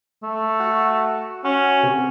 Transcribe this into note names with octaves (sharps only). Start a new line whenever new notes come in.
A3
F#4
C#4 F#4
C3